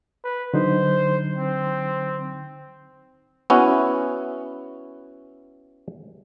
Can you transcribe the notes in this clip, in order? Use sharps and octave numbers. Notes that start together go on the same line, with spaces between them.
B4
D3 F#3 D#4 C5
C4
B3 C#4 E4 F#4